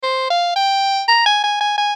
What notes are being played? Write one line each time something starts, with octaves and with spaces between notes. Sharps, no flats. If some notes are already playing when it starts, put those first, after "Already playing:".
C5
F5
G5
A#5
G#5
G#5
G#5
G#5